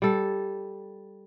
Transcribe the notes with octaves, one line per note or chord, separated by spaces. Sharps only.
G3 A4